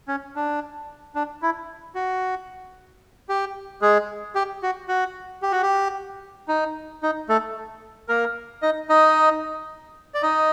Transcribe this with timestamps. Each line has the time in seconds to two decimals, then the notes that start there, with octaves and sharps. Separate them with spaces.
0.08 C#4
0.36 D4
1.15 D4
1.42 E4
1.95 F#4
3.29 G4
3.82 G#3 G#4
4.35 G4
4.63 F#4
4.88 F#4
5.42 G4
5.52 F#4
5.62 G4
6.48 D#4
7.03 D#4
7.29 A3 A4
8.08 A#3 A#4
8.62 D#4 D#5
8.89 D#4 D#5
10.14 D5
10.22 D#4 D#5